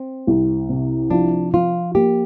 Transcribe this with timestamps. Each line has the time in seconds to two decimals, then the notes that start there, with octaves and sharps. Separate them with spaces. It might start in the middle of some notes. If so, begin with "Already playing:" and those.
Already playing: C4
0.27 C2
0.69 C3
1.10 F3 D4
1.54 F3 F4
1.95 A#3 G4